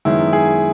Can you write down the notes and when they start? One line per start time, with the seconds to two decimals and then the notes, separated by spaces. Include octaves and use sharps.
0.05 F#2 D#3 G#3 B3 E4
0.33 G#4